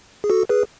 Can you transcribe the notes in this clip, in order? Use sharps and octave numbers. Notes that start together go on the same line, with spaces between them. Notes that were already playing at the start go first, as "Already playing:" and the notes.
G#4
F#4 A4
G#4 B4